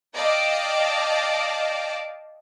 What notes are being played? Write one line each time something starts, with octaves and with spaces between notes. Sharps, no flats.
D5 D#5 F5 G5 A5 D6